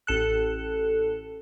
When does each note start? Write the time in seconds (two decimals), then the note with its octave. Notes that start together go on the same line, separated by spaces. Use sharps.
0.07 A1 A4 F#6